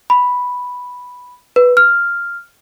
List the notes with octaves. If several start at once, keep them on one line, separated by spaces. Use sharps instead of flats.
B5
B4
F6